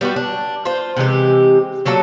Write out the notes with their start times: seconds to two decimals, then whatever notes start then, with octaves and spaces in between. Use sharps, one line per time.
0.01 G3 B3 D#4 F#4
0.16 D4
0.65 F4 C5
0.96 C3 E3 G#3 G4
1.86 D3 F#3 A#3 A4